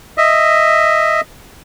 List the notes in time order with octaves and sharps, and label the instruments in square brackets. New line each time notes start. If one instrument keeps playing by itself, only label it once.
[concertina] D#5 E5